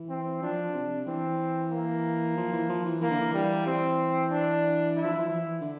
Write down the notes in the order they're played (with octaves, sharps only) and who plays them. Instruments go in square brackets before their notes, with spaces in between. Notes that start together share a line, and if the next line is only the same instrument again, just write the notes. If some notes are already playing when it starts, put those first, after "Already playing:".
Already playing: [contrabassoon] E3
[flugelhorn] C4
[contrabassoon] F3 [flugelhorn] D4
[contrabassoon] C3
[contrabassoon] E3 [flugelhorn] C4
[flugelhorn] A#3
[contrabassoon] F3
E3
F3
E3
[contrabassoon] E3 [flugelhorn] A#3
[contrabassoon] D3
E3
[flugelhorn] G3
C4
D4
E4
[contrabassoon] F3
E3
F3
[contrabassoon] E3 [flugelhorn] E4
[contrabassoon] D3